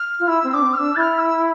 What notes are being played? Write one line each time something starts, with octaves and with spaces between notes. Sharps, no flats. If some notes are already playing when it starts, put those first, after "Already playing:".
Already playing: F6
F4
E4 E6
C4
E6
D4 D6
C4
F6
D4 E6
E4 F6 A6
E6